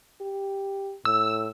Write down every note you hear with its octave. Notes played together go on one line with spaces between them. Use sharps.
G4
A2 E6